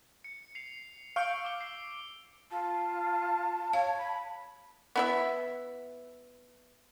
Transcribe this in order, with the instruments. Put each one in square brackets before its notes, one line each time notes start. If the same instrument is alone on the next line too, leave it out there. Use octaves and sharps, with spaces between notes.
[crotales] C#7
C7 F7
[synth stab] F5 C#6 G6 [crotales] E6 D7
[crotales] D6 G7
C7
[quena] F4 [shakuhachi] A5
[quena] C#5 [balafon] F5
[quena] B5
[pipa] B3 E4 E5